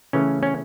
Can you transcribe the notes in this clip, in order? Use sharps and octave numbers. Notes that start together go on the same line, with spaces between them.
C#3 E3 A3 C#4
C#4